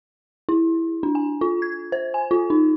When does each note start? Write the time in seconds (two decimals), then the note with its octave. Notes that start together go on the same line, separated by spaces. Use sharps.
0.49 E4
1.03 D4
1.15 G#5
1.41 F4
1.62 G#6
1.92 C5
2.14 G#5
2.31 F4
2.50 D#4